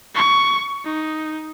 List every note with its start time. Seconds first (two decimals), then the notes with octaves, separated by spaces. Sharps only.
0.15 C#6
0.85 D#4